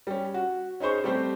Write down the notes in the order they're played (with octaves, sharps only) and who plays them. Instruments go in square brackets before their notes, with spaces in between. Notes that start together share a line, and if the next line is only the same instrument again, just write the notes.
[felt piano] G3 C#4
F#4
C#4 D#4 G#4 C5 C#6
G3 A3 C4 G4 C5